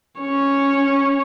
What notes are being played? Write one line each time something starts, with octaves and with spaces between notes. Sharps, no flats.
C#4 C#5